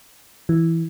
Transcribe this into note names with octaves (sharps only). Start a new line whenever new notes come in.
E3